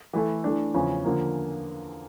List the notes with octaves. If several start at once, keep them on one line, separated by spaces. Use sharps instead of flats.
E3 A3 E4 A4
E3 A3 D4
E2 C#3 F3 C#4
D3 F3 A#3